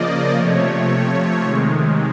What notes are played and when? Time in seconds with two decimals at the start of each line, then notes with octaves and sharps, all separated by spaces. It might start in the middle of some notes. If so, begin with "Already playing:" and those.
Already playing: C#3 F3 A#3 D5 D#5
0.34 C3 F3 A3 C#5
1.41 C3 D#3 G#3